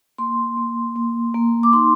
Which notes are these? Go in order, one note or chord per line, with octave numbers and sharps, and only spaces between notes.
A#3 C6
A#3
A#3
A#3
D6
D#4 C6